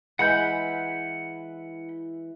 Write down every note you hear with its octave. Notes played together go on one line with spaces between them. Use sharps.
E3 G#3 F#5 B5 G6